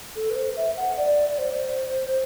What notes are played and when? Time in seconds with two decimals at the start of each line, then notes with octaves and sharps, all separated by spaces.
0.16 A4
0.30 B4
0.36 C5
0.57 E5
0.77 F#5
0.97 D5
1.29 D5
1.38 C5